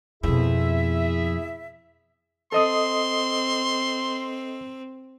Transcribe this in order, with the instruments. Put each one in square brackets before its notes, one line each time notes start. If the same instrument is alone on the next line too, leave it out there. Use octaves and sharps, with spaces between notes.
[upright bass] F2 B2 [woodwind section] E4 G#4 E5
[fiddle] C4 [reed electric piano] A4 D#5 D#6 [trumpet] C6